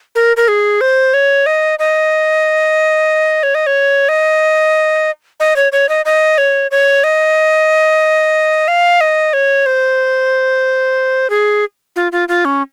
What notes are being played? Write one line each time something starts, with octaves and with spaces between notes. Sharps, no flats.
A#4
A#4
G#4
C5
C#5
D#5
D#5
C#5
D#5
C#5
D#5
D#5
C#5
C#5
D#5
D#5
C#5
C#5
D#5
F5
D#5
C#5
C5
G#4
F4
F4
F4
C#4